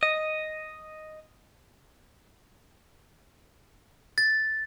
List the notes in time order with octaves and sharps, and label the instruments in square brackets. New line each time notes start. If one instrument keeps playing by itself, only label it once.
[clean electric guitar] D#5
[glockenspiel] A6